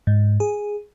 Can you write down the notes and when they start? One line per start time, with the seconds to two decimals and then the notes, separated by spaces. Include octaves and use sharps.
0.07 G#2
0.40 G#4